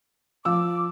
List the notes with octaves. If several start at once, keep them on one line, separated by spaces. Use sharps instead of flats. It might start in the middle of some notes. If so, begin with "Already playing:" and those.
F3 D6 E6